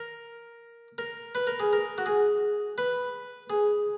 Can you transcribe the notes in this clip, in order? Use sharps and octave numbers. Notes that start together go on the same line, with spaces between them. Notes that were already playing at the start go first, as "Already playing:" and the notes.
Already playing: A#4
A#4
B4
A#4
G#4
A#4
F#4
G#4
B4
G#4